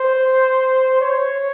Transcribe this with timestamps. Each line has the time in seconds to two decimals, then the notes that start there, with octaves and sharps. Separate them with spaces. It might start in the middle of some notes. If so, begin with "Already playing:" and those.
Already playing: C5
1.01 C#5